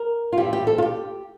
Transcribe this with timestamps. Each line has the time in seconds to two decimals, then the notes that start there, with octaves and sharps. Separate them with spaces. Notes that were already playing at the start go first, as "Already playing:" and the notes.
Already playing: A#4
0.33 F4
0.38 G2 E3 G3 C4 G4
0.53 G4
0.67 A4
0.78 F4
0.82 G4